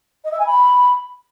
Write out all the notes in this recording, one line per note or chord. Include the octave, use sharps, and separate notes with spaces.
D#5
E5
G#5
B5